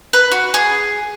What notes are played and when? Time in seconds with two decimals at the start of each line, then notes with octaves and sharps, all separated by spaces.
0.13 B4
0.32 F#4
0.54 G#4